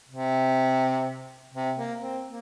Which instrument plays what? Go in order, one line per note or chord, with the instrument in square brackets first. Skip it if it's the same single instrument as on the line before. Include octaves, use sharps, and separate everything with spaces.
[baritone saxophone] C3
C3
A#3
C4
A#3